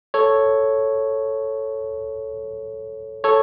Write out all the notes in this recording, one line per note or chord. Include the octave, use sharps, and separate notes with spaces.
A4 C#5
A4 C#5